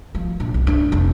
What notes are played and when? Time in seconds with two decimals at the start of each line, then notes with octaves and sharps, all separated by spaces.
0.15 F3
0.40 A#1
0.54 B1
0.67 D4
0.92 F1